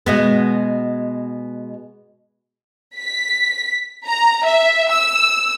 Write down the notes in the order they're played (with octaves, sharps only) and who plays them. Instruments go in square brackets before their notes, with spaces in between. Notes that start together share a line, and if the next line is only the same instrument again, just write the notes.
[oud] B2 G#3 B3
[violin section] B6
A#5
E5
E6